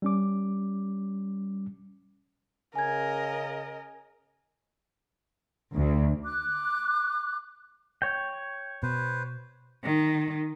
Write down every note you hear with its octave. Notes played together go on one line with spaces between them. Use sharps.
G3 C#4 D6
C#3 A#4 D#5 G#5 G#6
D2
D6 F#6
C#5 G5
B2 B4 C5
D#3